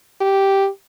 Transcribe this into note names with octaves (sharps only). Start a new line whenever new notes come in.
G4